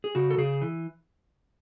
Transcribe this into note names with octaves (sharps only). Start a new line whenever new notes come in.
G#4
C#3 F#4
A4
C#3 G#4
E3